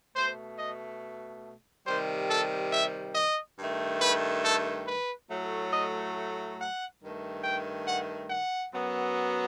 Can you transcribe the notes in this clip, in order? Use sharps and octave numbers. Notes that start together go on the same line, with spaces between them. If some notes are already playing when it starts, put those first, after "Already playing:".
B2 A3 C5
D#5
C3 D#3 G3 C5
A4
E5
D#5
G2 D#3 A3
B4
A4
B4
A2 F#3 A3
D#5
F#5
G2 D#3 A3
G5
F#5
F#5
F#2 F#3 B3